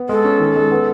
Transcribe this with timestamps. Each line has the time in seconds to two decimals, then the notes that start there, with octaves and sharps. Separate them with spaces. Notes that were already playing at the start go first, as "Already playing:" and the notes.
Already playing: B3
0.09 G#3 A4
0.24 C#4
0.40 D#3
0.56 G#3
0.71 B3